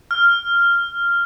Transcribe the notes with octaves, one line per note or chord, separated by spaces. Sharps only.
F6